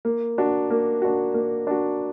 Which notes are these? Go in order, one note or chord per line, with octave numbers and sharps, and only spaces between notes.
A#3
D4 F#4
A#3
D4 F#4
A#3
D4 F#4